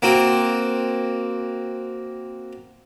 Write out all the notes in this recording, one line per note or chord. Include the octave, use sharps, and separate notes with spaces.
A#3 C4 F#4